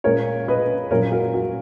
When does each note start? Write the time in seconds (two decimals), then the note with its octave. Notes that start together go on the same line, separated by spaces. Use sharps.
0.04 A#2 G#3 C#4 A#4 C#5
0.48 B4 D#5
0.91 A#2 F#3 C#4 A#4 C#5
1.12 F#4 A#4
1.34 F#4